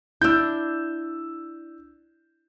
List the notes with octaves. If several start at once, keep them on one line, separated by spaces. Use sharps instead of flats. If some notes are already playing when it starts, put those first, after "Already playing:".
D4 E4 E6 G6